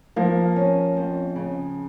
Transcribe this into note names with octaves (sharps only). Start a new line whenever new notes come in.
F3 A#3
C#4
F2
C#3